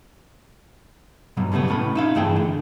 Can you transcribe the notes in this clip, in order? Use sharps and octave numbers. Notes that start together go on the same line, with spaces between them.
G2 B2 F#3 G3
C#3 F3 G3 A3 B3
C2 A2 C#4 A5 B5
D#4 E5 F5
G2 E3 A3 E4 G#4 G5
D3